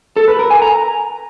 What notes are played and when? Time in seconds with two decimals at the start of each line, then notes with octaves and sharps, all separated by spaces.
0.17 A4
0.28 B4
0.39 A#4
0.50 G#5
0.62 A#5